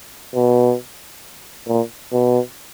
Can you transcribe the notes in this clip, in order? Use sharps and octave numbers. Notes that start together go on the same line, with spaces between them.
B2
A#2
B2